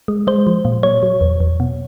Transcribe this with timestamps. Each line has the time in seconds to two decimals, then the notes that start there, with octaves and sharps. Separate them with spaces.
0.08 G#3
0.27 G#3 C5
0.47 F3
0.65 A#2
0.83 F#3 C#5
1.03 F#3
1.21 E2
1.40 E2
1.60 B2